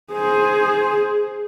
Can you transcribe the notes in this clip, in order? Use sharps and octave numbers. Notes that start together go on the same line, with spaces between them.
G#4 C5